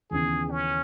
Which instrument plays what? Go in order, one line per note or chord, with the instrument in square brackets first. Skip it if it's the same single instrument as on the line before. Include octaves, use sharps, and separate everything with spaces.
[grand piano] D#2 C#3 E3 B3 [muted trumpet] G#4
[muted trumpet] C#4